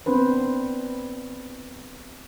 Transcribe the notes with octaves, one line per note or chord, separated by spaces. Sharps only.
B3 C4 D4 B4 C5